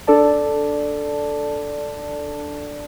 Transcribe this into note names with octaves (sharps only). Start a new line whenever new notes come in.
D4 A4 D5 A5